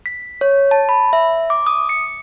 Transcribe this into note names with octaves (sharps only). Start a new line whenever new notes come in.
B6
C#5
A5
B5
E5
D6
D#6
C#7